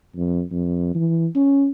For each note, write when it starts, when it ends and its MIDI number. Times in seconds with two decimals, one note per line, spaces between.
0.16 0.42 41
0.51 0.92 41
0.95 1.27 52
1.35 1.71 61